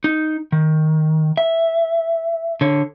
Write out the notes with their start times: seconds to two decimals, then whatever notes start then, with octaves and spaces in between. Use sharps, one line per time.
0.04 D#4
0.52 D#3
1.37 E5
2.61 D3 C#5